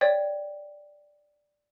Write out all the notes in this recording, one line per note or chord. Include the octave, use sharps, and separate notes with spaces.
C#5 D5 G5